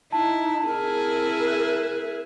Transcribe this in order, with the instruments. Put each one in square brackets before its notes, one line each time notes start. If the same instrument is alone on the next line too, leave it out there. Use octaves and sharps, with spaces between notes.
[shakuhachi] D#4 [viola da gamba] E4 [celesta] A5
[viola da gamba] C4 E4 G#4 [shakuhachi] A#4
[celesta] E5 F#6